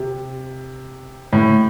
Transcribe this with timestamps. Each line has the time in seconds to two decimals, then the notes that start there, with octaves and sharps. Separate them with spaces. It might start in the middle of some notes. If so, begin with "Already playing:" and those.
Already playing: C3
1.33 A2